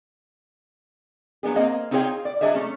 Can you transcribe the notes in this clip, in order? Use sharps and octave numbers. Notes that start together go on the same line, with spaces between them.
F#3 B3 D4 G#4
A#3 C4 G#4 D#5 F5
C4 D#4 F4 G#4 C#5 G5
D5
F#3 G#3 D4 G#4 D#5 E5
A3 C#4